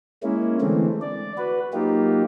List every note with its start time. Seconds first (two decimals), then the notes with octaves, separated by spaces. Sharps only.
0.23 G#3 A#3 C#4 E4
0.61 D3 E3 G#3 A3 C4
1.02 D5
1.38 F#4 B4
1.73 F#3 A#3 D#4 F4 G4